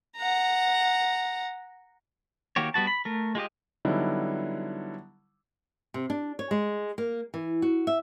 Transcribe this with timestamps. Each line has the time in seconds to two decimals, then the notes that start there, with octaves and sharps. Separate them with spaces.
0.17 F#5 A#5
2.56 D#3 A#3 F#4 G4 C#5
2.74 G3 B3 F#4 A5
2.87 B5
3.05 A3 A#4
3.35 G#3 F4 G4 D#5
3.85 D3 F#3 G3 B3 D#4 E4
5.94 C3
6.10 D4
6.39 C#5
6.51 G#3
6.98 A#3
7.34 E3
7.62 F#4
7.87 E5